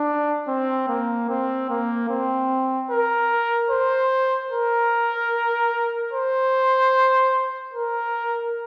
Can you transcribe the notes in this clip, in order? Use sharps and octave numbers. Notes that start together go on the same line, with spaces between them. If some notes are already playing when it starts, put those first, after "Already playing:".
Already playing: D4
C4
A#3
C4
A#3
C4
A#4
C5
A#4
C5
A#4